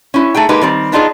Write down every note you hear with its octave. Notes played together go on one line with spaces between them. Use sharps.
C#4 E4
A3 D#4 G#4 G5
G#3 A#3 D#4 G4 A4 B4
D#3 G3 C4
B3 D4 D#4 F4 F#4 G#4